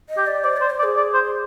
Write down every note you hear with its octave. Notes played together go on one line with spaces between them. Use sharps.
D#5
G4
D5
C5 D5
C5 D5
C5
D5
G#4
D5
C5